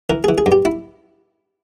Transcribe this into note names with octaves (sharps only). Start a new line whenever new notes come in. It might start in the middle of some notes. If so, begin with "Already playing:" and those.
E3 A#4
E3 G#4
G#4
G2
G4
E4